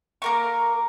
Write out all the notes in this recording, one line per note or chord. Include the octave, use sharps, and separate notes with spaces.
A#3 A#4 C#6